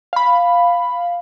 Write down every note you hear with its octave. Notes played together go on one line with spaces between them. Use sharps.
F5 B5